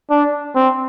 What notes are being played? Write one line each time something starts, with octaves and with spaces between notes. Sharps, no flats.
D4
C4